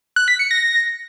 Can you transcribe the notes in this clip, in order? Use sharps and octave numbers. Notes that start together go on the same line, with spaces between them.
F#6
B6
C#7
A#6